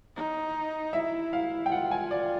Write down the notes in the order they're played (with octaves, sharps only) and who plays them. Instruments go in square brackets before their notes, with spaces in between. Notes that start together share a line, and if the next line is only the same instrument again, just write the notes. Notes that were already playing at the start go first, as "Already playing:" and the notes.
[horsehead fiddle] D#4
[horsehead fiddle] E4 [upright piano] E5
[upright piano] F5
G5
[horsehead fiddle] F4 [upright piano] F#5
[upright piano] G#5
D5